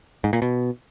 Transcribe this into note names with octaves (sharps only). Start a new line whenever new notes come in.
G#2
A#2
B2